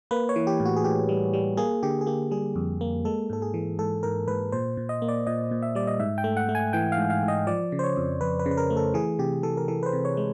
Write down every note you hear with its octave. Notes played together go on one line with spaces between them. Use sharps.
A#3 B4
C#5
E3
G4
A2
F#4
G#4
A2 G4
G3
G3
A#3 G#4
D3 G4
G#4
A#3 G4
G3 G#4
F2
A#3
G#3 A4
G#2 A4
G#4
E3
G#2 A4
G#2 A#4
G#2 B4
A#2 C5
A#2
D#5
A#3
D5
A#2 D#5
A#2
E5
G3 D5
D#5
G#2 E5
G5
A3
F#5
A3
G#5
E3 G5
F5
G#2
F5
G#2
D#5
F3 D5
C#3
C5
C#5
F2
F2 B4
B4
C#3
B4
A#4
A3
A4
E3 G#4
C3 G4
E3 A4
A#4
E3 A4
B4
C5
C3
C#5
G#3